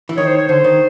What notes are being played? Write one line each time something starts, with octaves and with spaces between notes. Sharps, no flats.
E3
D#3 C#5
C5
C#5
D3 C5
D#3